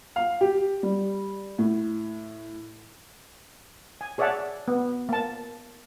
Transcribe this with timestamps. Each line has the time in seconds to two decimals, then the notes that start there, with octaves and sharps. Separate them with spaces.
0.16 F5
0.41 G4
0.83 G3
1.58 A2
4.01 G#5
4.18 G#4 C#5 D5 E5 F#5 A5
4.68 B3
5.09 A#3 A5